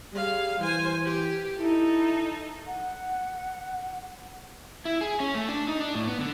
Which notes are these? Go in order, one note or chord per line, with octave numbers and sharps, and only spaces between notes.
G3 G#4 F5
E3 C5 G#5
G4
D#4 E4 A4
F#5
E4
G#4
C#4
A3
D4
D#4
D4
A2
B3
D3